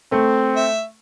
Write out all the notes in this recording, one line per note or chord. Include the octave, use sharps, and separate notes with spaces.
A3 C4
E5